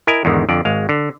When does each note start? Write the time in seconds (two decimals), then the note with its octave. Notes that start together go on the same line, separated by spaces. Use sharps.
0.07 E4 A#4 D#5 G#5
0.25 E2 G#2 D3 D#3
0.49 F2 D3 D5
0.65 G#1 G#3 F5
0.89 D3